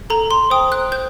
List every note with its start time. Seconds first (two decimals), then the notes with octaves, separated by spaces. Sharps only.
0.10 A4 A#5
0.31 C6
0.50 C5 G5 D#6
0.72 F#6
0.92 C5 G6